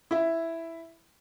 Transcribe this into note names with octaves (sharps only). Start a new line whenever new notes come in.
E4 E5